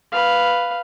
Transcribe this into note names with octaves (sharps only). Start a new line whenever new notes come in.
B4 F5